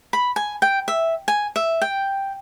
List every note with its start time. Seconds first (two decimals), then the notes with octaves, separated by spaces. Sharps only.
0.13 B5
0.36 G#5
0.62 G5
0.88 E5
1.28 G#5
1.56 E5
1.82 G5